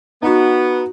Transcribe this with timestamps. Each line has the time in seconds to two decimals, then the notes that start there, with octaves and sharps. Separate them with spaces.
0.22 B3 D#4 F#4